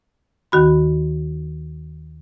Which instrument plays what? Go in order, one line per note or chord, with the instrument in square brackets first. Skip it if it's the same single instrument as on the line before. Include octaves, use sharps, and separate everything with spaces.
[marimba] D#2 D#3 F#4 B5